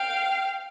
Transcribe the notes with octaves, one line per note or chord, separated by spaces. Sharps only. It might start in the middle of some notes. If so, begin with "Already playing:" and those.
Already playing: F5 G5